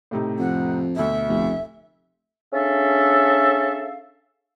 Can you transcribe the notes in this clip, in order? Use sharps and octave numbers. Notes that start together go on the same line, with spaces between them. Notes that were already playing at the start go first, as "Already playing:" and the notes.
A2 C3 D#4
F2 F#5
D2 B2 E5
F1
C#4 D4 G#4 A4 E5 F5